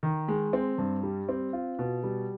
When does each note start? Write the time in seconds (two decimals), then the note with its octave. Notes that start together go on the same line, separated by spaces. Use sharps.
0.03 D#3
0.28 G#3
0.53 C4
0.78 G2
1.03 G3
1.29 C4
1.53 F4
1.79 B2
2.03 G3